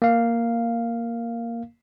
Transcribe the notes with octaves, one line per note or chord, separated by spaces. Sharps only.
A#3 F5